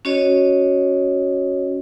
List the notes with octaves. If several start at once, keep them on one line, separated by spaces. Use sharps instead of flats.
C#4 F#4 C#5 D#5